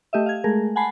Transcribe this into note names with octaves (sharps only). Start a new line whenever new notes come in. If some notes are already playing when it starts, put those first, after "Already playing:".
A3 G4 D#5 E5
F5 G#6
G#3 A3 G#4 A#4
F#5 G#5 A5 B5 C7